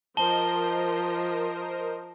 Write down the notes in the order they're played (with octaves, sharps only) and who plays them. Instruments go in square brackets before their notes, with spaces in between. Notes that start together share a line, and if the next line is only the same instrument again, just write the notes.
[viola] F3 [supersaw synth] A#4 C5 D#5 [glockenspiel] A5 G7